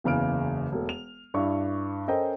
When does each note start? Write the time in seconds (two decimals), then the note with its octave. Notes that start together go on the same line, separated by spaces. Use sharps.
0.04 F#1 E2 C#3 F6 D7
0.72 E1 A3
0.89 F7
1.34 G2 D4 E4 C#6
2.08 C#4 A4 A#4 C5 D#5 G5